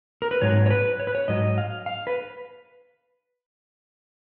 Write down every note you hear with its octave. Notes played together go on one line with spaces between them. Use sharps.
A#4
B4
G#2 F#3 C#5
C#5
B4
C#5
B4
C#5
G#2 F#3 D#5
F5
F5
B4